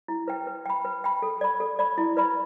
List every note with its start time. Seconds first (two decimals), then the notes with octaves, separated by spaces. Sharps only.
0.08 E4
0.28 B4 G5
0.47 B4
0.66 G5 B5
0.85 B4
1.04 G5 B5
1.22 A4
1.41 D5 B5
1.60 A4
1.79 D5 B5
1.98 E4
2.17 B4 D5 B5